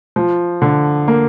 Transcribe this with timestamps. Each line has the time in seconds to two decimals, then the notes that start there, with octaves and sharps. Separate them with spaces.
0.16 F3
0.62 D3
1.08 A#3